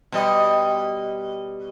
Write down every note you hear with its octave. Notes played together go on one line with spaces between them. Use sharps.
B2 G3 D#5